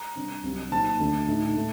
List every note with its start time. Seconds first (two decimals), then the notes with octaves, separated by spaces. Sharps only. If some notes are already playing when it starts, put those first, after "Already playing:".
Already playing: A#5
0.16 C3 G3 D4
0.44 C2 C3 F#3
0.71 A#2 F#3 C4 D#4 A5
0.99 D2 D3 A3 D4
1.28 A2 A3 D#4
1.56 A2 A3